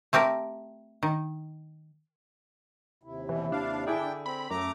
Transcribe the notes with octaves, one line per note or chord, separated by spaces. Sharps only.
A3 C4 G4 A#4
D#3
D#2 C3 E4
B2 E3
D4 F5
D3 E4 G#4 G5
C4 B5
F#2 A3 A#5 D6